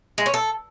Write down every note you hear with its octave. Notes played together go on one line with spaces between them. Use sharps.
G#3
C#4
A4